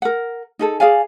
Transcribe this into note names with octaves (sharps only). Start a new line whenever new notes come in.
A#4 F#5
D#4 G#4 A4
G#4 D5 F5 G#5